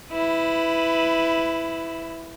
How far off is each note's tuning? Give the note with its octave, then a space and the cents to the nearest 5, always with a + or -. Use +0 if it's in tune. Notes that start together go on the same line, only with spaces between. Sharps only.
E4 +0 B4 +20